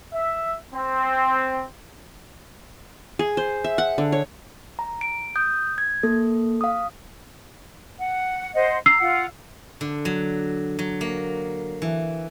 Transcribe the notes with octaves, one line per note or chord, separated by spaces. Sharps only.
E5
C4
G#4
C5
E5
F#5
D3
C#5
A#5
D7
D#6 G6
G#6
A#3 A4
F5 D#6
F#5
C5 D#5 F#5
A#5 E6 C7
F4 F#5
D3
F#3
F#3
A#3
E3